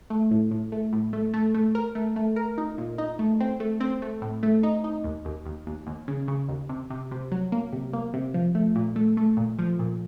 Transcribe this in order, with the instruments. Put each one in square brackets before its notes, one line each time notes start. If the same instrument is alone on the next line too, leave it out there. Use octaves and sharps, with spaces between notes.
[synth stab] A3
A2
A2
A3
A2
A3
A3
A3
A#4
A3
A3
A#4
D#4
A#2
D#4
A3
C4
A3
C4
A3
A2
A3
D#4
D#4
D#2
D#2
D#2
D#2
D#2
C#3
C#3
D#2
C3
C3
C3
F#3
A#3
C3
A#3
C3
F3
A3
A#2
A3
A3
A#2
F3
A#2